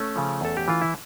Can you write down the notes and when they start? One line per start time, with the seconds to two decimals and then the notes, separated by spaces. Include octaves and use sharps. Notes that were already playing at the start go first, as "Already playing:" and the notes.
Already playing: A3 C#4
0.16 C#3 F3
0.41 E2 A4
0.57 G4
0.68 E3 F4
0.81 E4